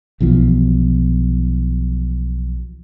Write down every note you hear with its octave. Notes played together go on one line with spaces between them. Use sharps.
B1 B2 E3 F3